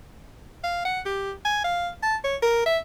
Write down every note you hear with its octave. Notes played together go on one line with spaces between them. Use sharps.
F5
F#5
G4
G#5
F5
A5
C#5
A#4
E5